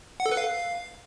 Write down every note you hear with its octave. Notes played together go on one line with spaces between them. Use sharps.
F#5
A4
B4
F5